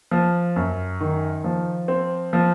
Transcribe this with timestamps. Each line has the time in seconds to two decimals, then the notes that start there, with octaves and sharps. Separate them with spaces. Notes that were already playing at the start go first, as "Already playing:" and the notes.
0.11 F3
0.56 F#2
1.00 D#3
1.44 F3
1.88 C4
2.33 F3